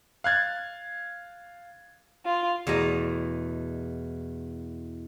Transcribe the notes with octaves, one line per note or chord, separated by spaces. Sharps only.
F5 F#6 G#6 A6
F4
E2 B2 A3 D#5 A#5